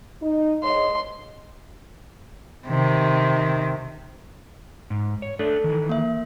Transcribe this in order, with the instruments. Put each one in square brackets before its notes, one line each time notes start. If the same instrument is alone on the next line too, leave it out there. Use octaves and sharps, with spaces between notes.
[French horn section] D#4
[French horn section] G#2 C#5 D#5 [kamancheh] C6
[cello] C3 D#3
[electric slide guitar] G#2
C#5
[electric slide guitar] A3 D4 D5 [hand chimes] A4
[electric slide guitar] D#3 E3
[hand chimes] A#3 E5